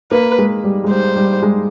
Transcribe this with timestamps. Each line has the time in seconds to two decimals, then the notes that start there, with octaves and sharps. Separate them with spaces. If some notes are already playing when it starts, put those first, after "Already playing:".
0.11 A#3 B4
0.38 G#3
0.64 G3
0.84 G#3
0.90 G3 C5
1.16 G3
1.42 G#3